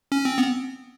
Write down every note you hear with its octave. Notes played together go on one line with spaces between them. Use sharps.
C#4
C4
B3